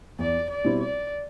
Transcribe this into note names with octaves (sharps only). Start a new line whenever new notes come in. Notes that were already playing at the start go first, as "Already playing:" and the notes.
E2 D5
D5
B2 G3 C4 E4
D5